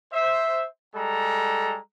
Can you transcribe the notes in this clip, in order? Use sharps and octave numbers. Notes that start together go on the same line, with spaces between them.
C5 E5
G3 G#3 A4 A#5